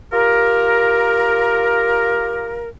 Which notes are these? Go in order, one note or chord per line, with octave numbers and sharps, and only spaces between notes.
F4 G4 A#4